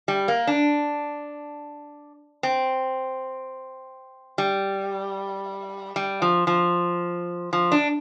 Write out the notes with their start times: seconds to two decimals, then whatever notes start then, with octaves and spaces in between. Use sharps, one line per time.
0.08 G3
0.28 A#3
0.47 D4
2.43 C4
4.38 G3
5.96 G3
6.22 F3
6.47 F3
7.53 F3
7.72 D4